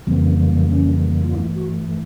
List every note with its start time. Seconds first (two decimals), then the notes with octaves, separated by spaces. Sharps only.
0.07 F2 C#3 E3 G3 A#3 C4
0.71 C#4
1.24 F4
1.35 G2 E3 A3 E4
1.56 F#4